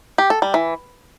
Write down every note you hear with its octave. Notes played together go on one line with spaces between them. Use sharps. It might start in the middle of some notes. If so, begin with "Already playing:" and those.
G4
A4
G3
E3